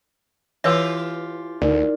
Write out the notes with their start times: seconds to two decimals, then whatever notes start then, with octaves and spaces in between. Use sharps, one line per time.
0.64 E3 F4 G4 B4 C#5 E5
1.62 D2 D#4 A#4 D5